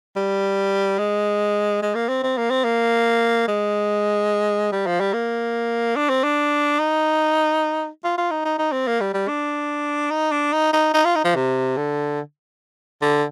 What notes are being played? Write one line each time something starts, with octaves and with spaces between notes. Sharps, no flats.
G3
G#3
G#3
A#3
C4
C4
A#3
C4
A#3
G#3
G3
F3
G3
A#3
D4
C4
D4
D#4
F4
F4
D#4
D#4
D#4
C4
A#3
G3
G3
D4
D#4
D4
D#4
D#4
D#4
F4
D#4
F3
C3
D3
D3